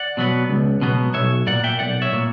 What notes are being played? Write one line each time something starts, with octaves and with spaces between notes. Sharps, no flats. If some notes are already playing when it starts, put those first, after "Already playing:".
Already playing: D5 F#5
B2 F#3 B3
C#2
B2 F#3 B3
B1 C#5 E5
A#2 A#3 D5 F#5
E5 G5
B1 D5 F#5
C#5 E5
A#2 A#3